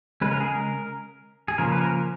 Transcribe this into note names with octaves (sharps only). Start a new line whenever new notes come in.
C#3 G#3 C#4 B4
A#4
G#4
A#4
G#4
C#3 F3 A#3 C#4 A#4
B4
A#4